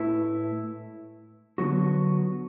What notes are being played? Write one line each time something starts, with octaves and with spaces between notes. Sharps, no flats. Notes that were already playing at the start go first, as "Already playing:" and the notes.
Already playing: A2 A3 E4 B4
D3 F#3 B3 F#4